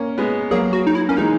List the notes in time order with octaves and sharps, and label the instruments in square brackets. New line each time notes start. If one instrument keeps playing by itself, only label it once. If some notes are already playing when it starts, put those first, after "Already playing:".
Already playing: [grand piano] A#3 C#4
G#3 B3
[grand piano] F#3 A#3 [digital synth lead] G#4
[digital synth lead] F#4
D#4
E4
[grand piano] A#3 [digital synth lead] C#4
[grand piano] E3 G#3 [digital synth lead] D#4